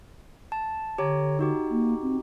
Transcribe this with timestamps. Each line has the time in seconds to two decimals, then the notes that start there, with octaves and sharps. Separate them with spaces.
0.52 A5
0.98 D3 G4 C#5 A#5
1.39 D#4 F#4 G4
1.71 A#3
2.02 C4